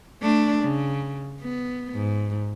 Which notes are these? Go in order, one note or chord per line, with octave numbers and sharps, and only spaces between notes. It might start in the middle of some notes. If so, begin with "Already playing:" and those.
A3 D4
C#3
B3
G#2